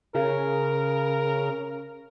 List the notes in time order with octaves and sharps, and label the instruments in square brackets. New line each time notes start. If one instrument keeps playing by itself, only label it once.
[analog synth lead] C#3 [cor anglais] A#4